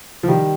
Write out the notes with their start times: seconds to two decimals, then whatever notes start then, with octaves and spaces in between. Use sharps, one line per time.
0.23 F3
0.28 D#3 G3